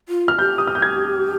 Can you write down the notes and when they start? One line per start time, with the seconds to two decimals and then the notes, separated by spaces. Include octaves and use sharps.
0.09 F4
0.28 F6
0.39 G4 G6
0.58 D#6
0.67 F6
0.75 G6
0.82 G#6